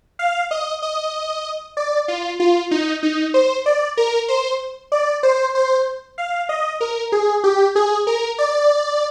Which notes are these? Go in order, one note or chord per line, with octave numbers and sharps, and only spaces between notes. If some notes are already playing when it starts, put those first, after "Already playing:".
F5
D#5
D#5
D5
F4
F4
D#4
D#4
C5
D5
A#4
C5
D5
C5
C5
F5
D#5
A#4
G#4
G4
G#4
A#4
D5